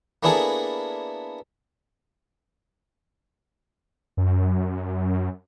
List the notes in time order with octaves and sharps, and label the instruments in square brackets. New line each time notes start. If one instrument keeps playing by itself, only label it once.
[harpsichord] A#3 B3 D4 E4 G#4 A4
[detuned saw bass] F#2